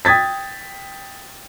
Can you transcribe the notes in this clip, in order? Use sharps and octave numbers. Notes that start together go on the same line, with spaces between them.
G5 D#6 G#6 A6 B6